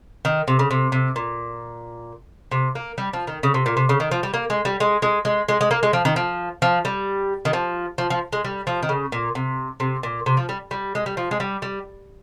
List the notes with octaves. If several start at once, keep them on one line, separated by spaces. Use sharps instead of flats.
D#3
C3
C#3
C3
C3
A#2
C3
A#3
G3
F3
D#3
C#3
C3
A#2
C3
C#3
D#3
F3
G3
A#3
G#3
G3
G#3
G#3
G#3
G#3
G#3
A#3
G#3
F3
D#3
F3
F3
G3
D#3
F3
F3
F3
G#3
G3
F3
D#3
C#3
A#2
C3
C3
A#2
C3
F3
G3
G3
G#3
G3
F3
G#3
G3
G3